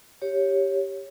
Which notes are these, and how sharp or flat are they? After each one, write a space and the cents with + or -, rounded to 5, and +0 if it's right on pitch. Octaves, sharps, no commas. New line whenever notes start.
G4 +0 C#5 +0